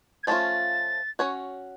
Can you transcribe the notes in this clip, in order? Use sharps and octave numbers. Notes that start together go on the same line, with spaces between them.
G#6
F3 A3 C#4 F4 A6
C#4 F#4 C#5